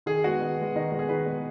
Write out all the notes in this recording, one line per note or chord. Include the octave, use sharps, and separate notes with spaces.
D#3 G#4
G#3 B3 F#4
D#3
G#3 B3
D#3 D#4
G#3 B3
G#4
D#3 B4
G#3 B3